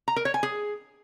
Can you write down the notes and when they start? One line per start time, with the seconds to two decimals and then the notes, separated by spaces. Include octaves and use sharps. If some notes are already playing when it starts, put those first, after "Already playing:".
0.08 A#5
0.16 A#4
0.25 C#5
0.34 G#5
0.43 G#4